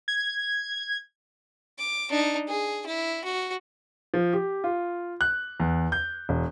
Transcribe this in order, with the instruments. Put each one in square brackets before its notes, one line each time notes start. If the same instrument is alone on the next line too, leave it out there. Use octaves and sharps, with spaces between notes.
[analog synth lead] G#6
[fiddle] D6
D4 D#4
G#4
E4
F#4
[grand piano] F3
G4
F4
F#6
E2
G6
E1